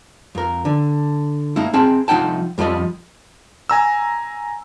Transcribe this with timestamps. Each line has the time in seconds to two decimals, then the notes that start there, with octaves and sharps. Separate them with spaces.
0.35 F2 A#4
0.65 D3
1.56 A#3 D#4 E4
1.73 C4 G#4 G5 A5
2.08 C2 F3 D#4 F#5 G5 A5
2.58 F2 F3 G3 C5 D#5
3.70 G#5 A#5 E6